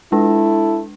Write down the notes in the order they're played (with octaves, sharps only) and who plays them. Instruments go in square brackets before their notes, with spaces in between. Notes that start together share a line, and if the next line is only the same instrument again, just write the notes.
[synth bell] G#3 D4 [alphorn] E4 [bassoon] A4